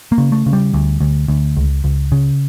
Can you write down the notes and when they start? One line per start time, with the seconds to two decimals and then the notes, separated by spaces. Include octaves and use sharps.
0.12 A#3
0.18 C#3
0.32 A3
0.46 C#3
0.53 G3
0.73 D2
1.00 D2
1.28 D2
1.56 C#2
1.84 C#2
2.12 C#3